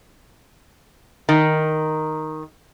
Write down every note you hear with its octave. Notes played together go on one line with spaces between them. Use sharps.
D#3